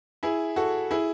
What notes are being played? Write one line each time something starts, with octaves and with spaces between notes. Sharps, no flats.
E4 G#4
F#4 A4
E4 G#4